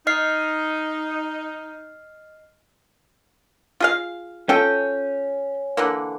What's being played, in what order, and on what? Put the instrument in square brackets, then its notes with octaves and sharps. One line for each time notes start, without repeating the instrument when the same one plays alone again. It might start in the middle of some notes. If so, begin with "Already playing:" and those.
[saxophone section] D#4 [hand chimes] D#5 F6 C7
[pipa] F4 G#4 F5
[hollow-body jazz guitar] C#4 [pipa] F4 A4 G5
[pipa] D3 E3 A#3